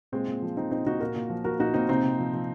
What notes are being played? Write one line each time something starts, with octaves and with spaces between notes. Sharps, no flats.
A#2 G#3 C4
A#2
F3
F3 C4 D#4
A#2 C4 D#4
A#2 D#4 F#4
A#2 F#4 A#4
A#2
F3
F3 F#4 A#4
A#2 D#4 F#4
A#2 C4 D#4
C3 C4 D#4
C3
F3
F3